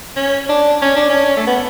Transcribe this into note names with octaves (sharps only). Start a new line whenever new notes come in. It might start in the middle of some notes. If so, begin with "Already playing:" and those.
C#4
D4
C#4
D4
C#4
A3
B3